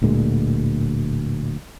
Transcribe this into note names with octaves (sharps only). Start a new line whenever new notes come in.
D1 D2 A#2 G#3